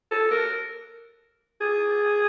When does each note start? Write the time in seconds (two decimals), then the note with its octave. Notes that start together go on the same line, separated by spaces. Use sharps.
0.11 A4
0.31 A#4
1.61 G#4